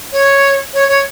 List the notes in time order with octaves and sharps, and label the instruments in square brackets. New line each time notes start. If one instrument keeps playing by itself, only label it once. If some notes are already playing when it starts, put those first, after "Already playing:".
[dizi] C#5
C#5
C#5